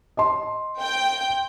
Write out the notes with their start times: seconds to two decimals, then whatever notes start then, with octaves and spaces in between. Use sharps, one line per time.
0.17 D#5 A5 C6
0.80 G5